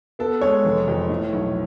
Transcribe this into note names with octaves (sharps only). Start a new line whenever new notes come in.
B3 A4
G#3 C#5
F1
F2
A2
B1